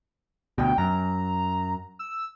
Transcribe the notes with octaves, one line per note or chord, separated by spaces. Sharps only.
D2 B2 G5
F#2 A#5
E6